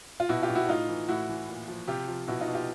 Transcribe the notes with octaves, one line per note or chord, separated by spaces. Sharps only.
F4
B2 E4 F#4
F4 G4
B2
E4 F#4
A2 D#4 F4
E3
A2 E4 F#4
E3
A#2
F3
C3 F4 G4
F3
B2 E4 F#4
D#4 F4
B2
F4 G4